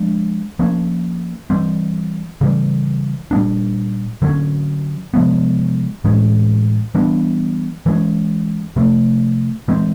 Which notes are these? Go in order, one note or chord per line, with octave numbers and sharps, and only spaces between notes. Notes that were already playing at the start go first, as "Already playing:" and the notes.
Already playing: F3 G#3 D4
F3 A#3 C#4
E3 G3 C4
C#3 E3 G3
A#2 G3 B3 D4
D3 F#3 A3 C#4
C3 F3 G#3 B3
A2 E3 G#3 C#4
E3 G3 B3 D4
E3 G#3 C#4
C3 F3 A3
E3 G#3 C4